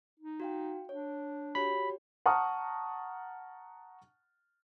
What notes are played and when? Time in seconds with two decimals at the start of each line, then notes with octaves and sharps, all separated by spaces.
0.19 D#4
0.40 F#4 F5 G5
0.89 D4 C#5
1.55 F#4 G4 C#5 B5
2.26 F#5 A5 A#5 C#6 D#6 F6